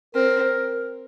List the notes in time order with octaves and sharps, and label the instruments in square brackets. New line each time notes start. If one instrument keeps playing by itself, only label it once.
[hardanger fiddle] C4 [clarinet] A#4